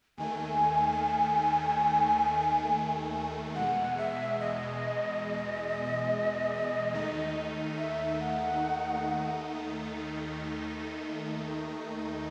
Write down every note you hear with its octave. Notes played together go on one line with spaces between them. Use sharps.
D#2 D#3 A3 G#5
E2 B2 G#3 F#5
E5
D#5
D#2 D#3 A3 D#4
E5
F#5